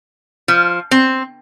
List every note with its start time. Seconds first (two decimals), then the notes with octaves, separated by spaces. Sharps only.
0.48 F3
0.91 C4